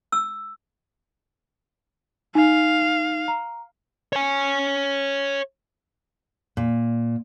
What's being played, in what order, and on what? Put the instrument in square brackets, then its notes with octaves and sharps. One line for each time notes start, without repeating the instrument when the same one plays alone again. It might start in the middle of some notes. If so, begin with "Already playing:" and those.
[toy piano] E6
[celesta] D#4 [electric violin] F5
[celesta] A#5
[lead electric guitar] C#5 G#5
[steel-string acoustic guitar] A#2